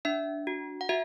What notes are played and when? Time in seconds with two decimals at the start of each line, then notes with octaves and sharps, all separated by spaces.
0.05 D4 E5
0.47 F#4
0.81 F#5
0.89 F#4 E5